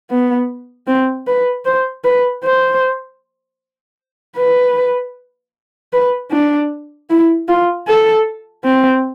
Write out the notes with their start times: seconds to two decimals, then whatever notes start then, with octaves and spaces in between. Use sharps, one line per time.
0.10 B3
0.87 C4
1.27 B4
1.65 C5
2.04 B4
2.44 C5
4.37 B4
5.93 B4
6.31 D4
7.10 E4
7.48 F4
7.87 A4
8.64 C4